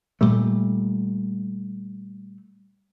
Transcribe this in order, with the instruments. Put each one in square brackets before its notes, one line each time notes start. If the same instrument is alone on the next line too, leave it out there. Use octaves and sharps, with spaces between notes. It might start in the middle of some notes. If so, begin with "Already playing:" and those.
[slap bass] A#2 G3 A3